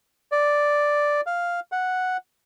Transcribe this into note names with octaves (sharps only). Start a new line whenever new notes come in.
D5
F5
F#5